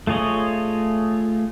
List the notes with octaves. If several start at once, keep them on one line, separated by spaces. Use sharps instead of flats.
A3 F4 G#4 C#5 D#5